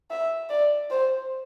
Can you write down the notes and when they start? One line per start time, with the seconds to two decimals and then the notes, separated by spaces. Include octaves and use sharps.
0.11 E5
0.50 D5
0.90 C5